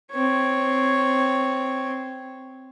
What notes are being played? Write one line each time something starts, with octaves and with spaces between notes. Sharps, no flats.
C4 C#5